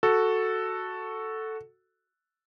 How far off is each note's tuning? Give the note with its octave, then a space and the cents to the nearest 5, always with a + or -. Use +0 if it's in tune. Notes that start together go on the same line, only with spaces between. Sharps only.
F#4 +0 A4 +0